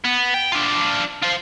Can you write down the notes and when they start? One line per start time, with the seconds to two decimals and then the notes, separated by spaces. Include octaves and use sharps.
0.04 B3
0.34 G5
0.52 D4 F4
1.23 F4 C5